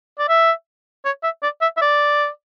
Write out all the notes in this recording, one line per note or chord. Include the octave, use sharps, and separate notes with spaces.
D5
E5
C#5
E5
D5
E5
E5
D5